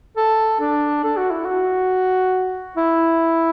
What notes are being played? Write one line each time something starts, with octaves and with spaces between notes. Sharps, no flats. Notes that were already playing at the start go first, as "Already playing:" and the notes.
A4
D4
A4
F#4
E4
F#4
E4